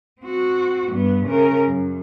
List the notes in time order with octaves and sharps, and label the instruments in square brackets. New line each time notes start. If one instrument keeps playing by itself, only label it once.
[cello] C4 F#4
G2 B3
C#3 A#4
F#2